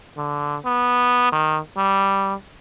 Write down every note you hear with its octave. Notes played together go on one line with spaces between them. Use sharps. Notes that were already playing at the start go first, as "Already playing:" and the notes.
D3
B3
D#3
G3